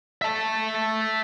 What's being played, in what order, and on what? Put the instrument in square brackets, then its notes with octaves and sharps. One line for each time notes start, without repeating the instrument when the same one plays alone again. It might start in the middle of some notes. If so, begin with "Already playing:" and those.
[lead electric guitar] E5 A5